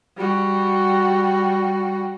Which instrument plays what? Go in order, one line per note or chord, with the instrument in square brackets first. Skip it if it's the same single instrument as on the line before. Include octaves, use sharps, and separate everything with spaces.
[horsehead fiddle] G3 F#4